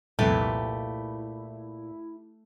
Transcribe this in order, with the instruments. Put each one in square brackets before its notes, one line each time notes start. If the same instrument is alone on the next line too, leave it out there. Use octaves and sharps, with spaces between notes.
[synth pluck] C2 F2 [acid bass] A#2 [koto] A3 G4 B4 [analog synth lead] E4